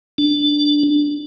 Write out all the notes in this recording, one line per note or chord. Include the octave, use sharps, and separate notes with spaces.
D4